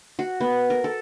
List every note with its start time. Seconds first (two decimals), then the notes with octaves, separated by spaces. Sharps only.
0.19 F#4
0.41 B3
0.70 A#4
0.84 A4